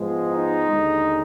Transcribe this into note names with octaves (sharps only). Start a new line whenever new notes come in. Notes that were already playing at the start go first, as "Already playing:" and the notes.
Already playing: G#2 F3 G#3 B3
D#4
D#2 D3 G#3